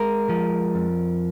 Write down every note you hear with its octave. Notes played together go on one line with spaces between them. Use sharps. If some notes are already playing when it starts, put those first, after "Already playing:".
Already playing: G#3 A#4
F3
F2